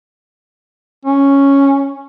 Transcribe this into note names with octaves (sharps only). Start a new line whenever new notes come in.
C#4